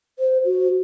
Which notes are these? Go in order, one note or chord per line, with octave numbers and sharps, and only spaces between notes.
C5
F#4